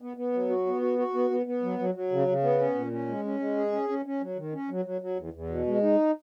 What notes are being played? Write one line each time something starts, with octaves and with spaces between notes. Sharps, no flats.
B3
B3
F#3
F#4
B3
F#4
F#4
B3
B3
B3
F#3
F#3
F#3
C#3
C#3
B3
C#4
A#2
C#4
G#3
C#4
G#3
G#4
C#4
C#4
C#4
F#3
D#3
C#4
F#3
F#3
F#3
E2
E2
B2
G#3
D#4